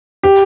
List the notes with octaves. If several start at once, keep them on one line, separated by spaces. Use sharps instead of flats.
G4